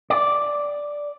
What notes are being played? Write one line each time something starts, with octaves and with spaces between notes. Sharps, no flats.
D5